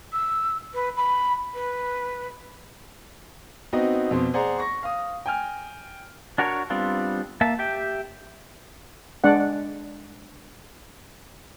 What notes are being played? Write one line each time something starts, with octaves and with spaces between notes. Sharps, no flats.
E6
B4
B5
B4
B3 C4 D#4 F#4 D#5
F2 B2 C5
G#4 C5 D5 F#5 A#5
C#6 A#6
F5 D#6
G5 G#5 F6
D4 F#4 A#4 C#5
G3 B3 C4 D4 F4
A#3 E5 A5
G4 E5 G5
G#3 D4 D5 F#5